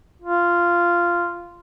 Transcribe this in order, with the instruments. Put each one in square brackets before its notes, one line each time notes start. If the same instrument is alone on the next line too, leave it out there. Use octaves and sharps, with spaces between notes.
[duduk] F4